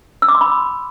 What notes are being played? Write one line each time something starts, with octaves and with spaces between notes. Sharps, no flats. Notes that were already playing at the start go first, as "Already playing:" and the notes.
E6
D6
C6
B5